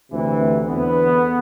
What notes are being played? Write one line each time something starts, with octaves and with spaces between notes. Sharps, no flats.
D2 C3 E3
C4
E2 D3 B3